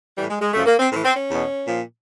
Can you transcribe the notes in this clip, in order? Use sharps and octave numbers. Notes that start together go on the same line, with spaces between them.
A2 E3 G3
G#3
G#3
F#2 C#3 F3 A3
A#3
C4
A2 E3 C4
C4
C#4
E2 B2
A#2 F3